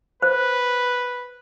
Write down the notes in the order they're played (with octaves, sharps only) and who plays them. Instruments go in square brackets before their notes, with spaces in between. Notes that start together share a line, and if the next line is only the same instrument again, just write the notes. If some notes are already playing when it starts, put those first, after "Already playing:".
[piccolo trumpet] B4 [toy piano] C5